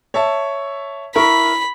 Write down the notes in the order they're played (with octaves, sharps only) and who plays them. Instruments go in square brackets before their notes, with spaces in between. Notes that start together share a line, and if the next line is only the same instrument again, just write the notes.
[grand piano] C#5 E5 A5
[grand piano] E4 A#4 C#6 [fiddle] B5